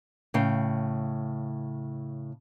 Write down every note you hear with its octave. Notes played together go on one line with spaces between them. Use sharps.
A2 C#3 F5 G5